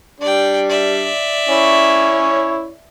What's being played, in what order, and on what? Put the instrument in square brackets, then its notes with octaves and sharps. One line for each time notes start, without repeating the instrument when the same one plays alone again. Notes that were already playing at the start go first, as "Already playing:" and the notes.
[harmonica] G3 D4 [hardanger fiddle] D5 G5
[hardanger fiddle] D5 E5
[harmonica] C#4 E4 C#5